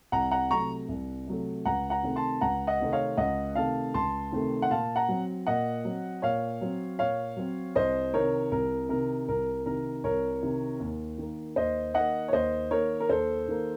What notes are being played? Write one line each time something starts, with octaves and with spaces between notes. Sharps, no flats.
C2 F#5 A#5
F#5 A#5
C3 F#3 A3 A#5 C#6
C2
C3 F#3 A3
C#2 F#5 A#5
F#5 A#5
C3 D#3 A3 C4
A5 C6
C#2 F#5 A#5
D#5 F#5
C3 D#3 A3 C4
C#5 F5
C#2 D#5 F#5
C3 D#3 A3 C4 F5 A5
C#2 A5 C6
C3 D#3 A3 C4
F#5
A#2 F5 A5
F#5 A#5
F#3 C4
A#2 D#5 F#5
F#3 C4
A#2 C#5 F5
F#3 C4
A#2 C#5 F5
F#3 C4
C2 C5 D#5
C3 D#3 A#4 C#5
C2 A#4
C3 D#3 A#4
C2 A#4
C3 D#3 A#4
C2 A#4 C#5
C3 D#3
D#2
D#3 A#3
D#2 C5 D#5
D#3 A#3 D#5 F#5
C#5
D#2 C5 D#5
D#3 A#3 A#4 C#5
A#4
D#2 A4 C5
D#3 A#3